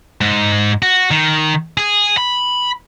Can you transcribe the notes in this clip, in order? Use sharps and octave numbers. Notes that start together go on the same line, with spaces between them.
G#2
F#4
D#3
G#4
B5